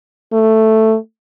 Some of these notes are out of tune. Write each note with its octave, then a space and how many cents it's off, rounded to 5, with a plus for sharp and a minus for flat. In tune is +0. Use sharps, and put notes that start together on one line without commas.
A3 +5